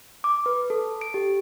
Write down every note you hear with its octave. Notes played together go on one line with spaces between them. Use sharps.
D6
B4
A4
D7
G4